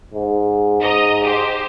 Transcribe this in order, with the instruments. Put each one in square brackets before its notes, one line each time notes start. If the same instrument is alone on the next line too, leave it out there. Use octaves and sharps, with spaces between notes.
[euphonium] G#2
[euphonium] G#2 [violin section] D#5 A#5
[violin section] G4 C5